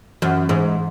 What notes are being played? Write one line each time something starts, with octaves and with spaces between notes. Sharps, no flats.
F#2 E3
G#2 E3